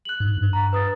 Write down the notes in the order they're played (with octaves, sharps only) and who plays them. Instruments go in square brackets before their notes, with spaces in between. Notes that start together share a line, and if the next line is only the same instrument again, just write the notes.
[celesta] F#6 F#7
[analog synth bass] G#2
G2
[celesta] A#5
B4 D#6 A6